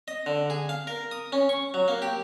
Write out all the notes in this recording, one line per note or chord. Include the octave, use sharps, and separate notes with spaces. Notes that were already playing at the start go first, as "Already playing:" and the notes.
D#5
D3
G#4
F5
A#4
D#6
C#4
C#6
F#3
A#3
G4